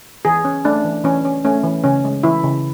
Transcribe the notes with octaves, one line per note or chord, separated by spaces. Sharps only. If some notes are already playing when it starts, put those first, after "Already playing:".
E3 G#4
C#4
A3 D4
E3
E3 C#4
C#4
A3 C#4
E3
C#3 C#4
G#3
E3 E4
C#3